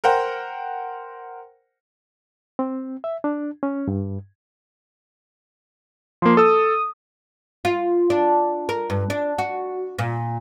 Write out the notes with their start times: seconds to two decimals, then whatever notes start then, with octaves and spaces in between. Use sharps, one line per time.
0.04 A#4 C5 F#5 G5
2.59 C4
3.04 E5
3.24 D4
3.63 C#4
3.88 G2
6.22 F3 A#3 C6
6.37 A4 D#6 E6
7.65 F4
8.10 D4
8.69 A#4
8.90 G2
9.10 D4
9.38 F#4
9.99 A#2